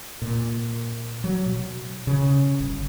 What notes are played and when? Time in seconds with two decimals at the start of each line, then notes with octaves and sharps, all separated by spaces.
0.22 A#2
1.24 F#3
1.46 B2
2.07 C#3
2.60 G1